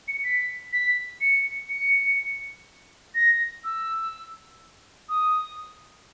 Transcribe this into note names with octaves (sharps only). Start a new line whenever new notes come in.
C#7
B6
B6
C#7
C#7
A#6
E6
D#6